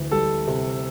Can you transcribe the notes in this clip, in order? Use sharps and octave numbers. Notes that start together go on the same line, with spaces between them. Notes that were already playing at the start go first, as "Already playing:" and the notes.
Already playing: D2 E3
G3 A4
C3